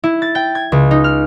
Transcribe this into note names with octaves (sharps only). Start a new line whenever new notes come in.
E4
A6
G5
G#6
C#2
D#4
F6